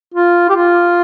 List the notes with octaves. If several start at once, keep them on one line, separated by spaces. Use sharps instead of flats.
F4
G4
F4